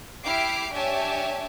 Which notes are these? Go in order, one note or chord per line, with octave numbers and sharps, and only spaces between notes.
E4 G4 D6 F6 C7 D7
D4 G4 C#5 E5 G#5 A5